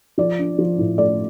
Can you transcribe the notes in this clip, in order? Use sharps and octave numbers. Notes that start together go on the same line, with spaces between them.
F3 D5
D4
F3
A2
A3 D5